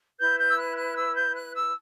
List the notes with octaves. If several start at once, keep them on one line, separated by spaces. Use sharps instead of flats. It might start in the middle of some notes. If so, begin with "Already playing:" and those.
E4 B4 G6
G6
E6
F#6
F#6
E6
G6
F#6
E6